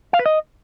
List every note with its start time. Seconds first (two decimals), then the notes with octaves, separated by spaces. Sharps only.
0.13 F5
0.19 B4
0.26 D#5